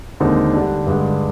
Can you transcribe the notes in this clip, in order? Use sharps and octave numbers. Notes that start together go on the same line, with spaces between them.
D#2 D3 G#3 C4 D#4
D3 G3 D4
G2 D3 G#3